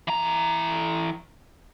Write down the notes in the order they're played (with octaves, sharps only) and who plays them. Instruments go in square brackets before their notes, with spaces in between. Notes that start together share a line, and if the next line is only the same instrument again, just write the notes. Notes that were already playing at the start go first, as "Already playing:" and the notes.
[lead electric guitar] E3 A#5